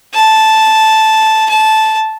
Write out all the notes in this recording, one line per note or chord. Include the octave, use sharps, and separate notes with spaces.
A5
A5